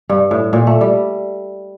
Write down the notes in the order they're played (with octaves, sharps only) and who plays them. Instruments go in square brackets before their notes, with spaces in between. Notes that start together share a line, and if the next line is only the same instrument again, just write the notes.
[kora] G2
A2
A#2
A3
G3